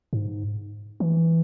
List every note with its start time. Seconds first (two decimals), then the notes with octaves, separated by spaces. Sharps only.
0.13 G#2
1.00 E3